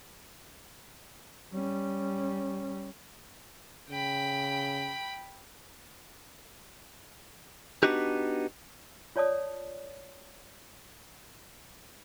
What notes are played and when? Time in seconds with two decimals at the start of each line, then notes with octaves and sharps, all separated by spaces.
1.53 G3 C#4
3.90 C#3 G5 B5
7.83 B3 D4 D#4 F#4 G4
9.16 F4 C#5 D5 A5 D#6